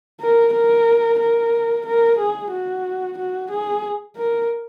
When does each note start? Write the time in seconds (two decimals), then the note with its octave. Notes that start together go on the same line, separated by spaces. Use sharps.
0.21 A#4
0.53 A#4
1.20 A#4
1.86 A#4
2.19 G#4
2.51 F#4
3.18 F#4
3.51 G#4
4.16 A#4